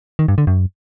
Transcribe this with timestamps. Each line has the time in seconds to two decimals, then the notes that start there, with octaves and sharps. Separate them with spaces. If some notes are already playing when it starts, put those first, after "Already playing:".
0.19 D#3
0.28 G2
0.38 D3
0.47 F#2